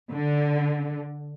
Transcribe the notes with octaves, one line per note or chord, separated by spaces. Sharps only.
D3